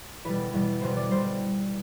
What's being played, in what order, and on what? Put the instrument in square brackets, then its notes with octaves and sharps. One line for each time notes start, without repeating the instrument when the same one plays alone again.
[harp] E2 B2 G3 B4
E2 B2 G3
E2 B2 G3 C5
D5
B2 G3 C5